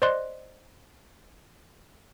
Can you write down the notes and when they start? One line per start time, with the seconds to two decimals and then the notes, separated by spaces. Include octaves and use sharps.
0.02 C5 D5 D#5 C6 F#6